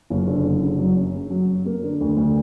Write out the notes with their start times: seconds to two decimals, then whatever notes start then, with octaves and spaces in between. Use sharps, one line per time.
0.10 F#1
0.28 D3
0.45 F#1
0.61 C#3
0.79 F#3
0.96 F#2
1.13 C#3
1.31 F#3
1.48 F#2
1.66 A#3
1.83 D3
2.01 D2
2.17 D2